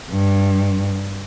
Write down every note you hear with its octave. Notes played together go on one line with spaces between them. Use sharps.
G2